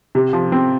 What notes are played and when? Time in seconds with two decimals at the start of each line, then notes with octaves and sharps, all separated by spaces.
0.15 C3
0.33 F3
0.52 C4